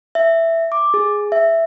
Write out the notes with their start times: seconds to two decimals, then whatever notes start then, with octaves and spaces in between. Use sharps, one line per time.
0.15 E5
0.72 D6
0.94 G#4
1.32 E5